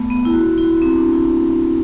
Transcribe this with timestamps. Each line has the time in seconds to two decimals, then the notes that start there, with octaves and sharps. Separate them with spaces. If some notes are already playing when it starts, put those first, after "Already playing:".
Already playing: A3 B3
0.10 B3
0.25 E4
0.33 F#4
0.58 E4
0.82 C4
0.98 D4
1.13 E4